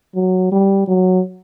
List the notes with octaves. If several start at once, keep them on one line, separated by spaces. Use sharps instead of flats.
F#3
G3
F#3